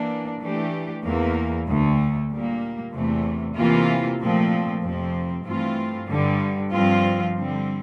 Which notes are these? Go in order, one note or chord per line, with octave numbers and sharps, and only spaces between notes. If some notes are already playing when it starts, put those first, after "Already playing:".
Already playing: E3 A#3 D4
E3 A3 D4 G4
E2 E3 A#3
D2 D3 A3
A#2 G3 A#3
E2 C3 E3 A3
C3 E3 A#3 F4
A#2 F3 A3 C4
F2 C3 F3 C4
G2 E3 A3 C4 F4
G2 D3 G3
G2 F3 C4 F4
D3 G3 C4